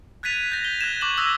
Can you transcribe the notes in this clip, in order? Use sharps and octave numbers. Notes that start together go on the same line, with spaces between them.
F#6 G#6 A6 B6 D#7 F7
G6 A#6
G7
F#6 G#6 E7
C#6 D6 G6 G#6 E7 F#7
D#6 E6 F#6 G#6 A#6